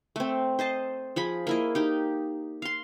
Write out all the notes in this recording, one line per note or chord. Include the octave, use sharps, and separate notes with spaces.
A3 C4
C5 D#5 A5
F3 G#4 B5
A#3 E4 D#5
D#4 G4
F5 C6